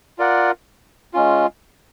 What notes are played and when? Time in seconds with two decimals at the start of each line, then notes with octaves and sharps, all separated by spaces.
0.18 F4 A#4 D5 F#5
1.13 G#3 C#4 F4